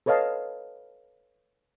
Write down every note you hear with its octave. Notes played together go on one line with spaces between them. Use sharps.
A4 B4 C#5 D#5 F5 A5